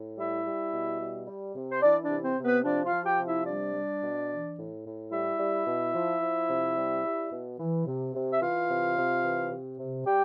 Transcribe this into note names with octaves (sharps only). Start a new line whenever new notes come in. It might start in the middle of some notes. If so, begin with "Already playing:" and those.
Already playing: A2
G3 E4 E5
G3
B2
G3
G3
C3
C5
E3 D4 D5
D4 D5
C3
C4 C5
C3
B3 B4
F3 D4 D5
F4 F5
F3
G4 G5
C3
E4 E5
G3 D4 D5
G3
B2
E3
A2
A2
G3 E4 E5
G3
B2
F3
F3
C3
G3
G3
B2
E3
C3
C3
E5
E3 F4 F5
C3
C3
E3
C3
C3
G3 G4 G5